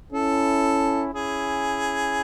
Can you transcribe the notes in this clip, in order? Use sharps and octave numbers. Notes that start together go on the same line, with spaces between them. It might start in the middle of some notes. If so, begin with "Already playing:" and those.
C#4 E4 A4
C#4 E4 G#4